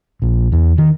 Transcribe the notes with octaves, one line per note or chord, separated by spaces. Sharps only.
A#1
E2
D#3